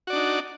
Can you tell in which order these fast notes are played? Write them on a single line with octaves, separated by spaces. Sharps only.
F#4 D5 D4 D#4